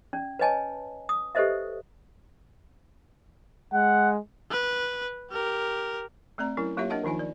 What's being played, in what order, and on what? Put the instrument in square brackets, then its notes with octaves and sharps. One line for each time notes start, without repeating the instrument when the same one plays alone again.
[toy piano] C#4 D5
B4 C#5 D#5 G#5 A5
D#6
G4 A4 B4 C5 D#5 E5
[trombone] G#3 [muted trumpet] F#5
[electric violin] B4
G4 A#4
[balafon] A3 C4 D5 A#5
F#3 C#4 E4 A#4
F#3 A#3 F4 G4 C#5 E5
D4 A#4 D#5 F#5 A5
D#3 F3 D#4 F4 G#5
D5